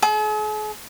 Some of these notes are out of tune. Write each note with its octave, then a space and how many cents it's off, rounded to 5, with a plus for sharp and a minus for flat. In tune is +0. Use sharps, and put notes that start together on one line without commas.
G#4 +45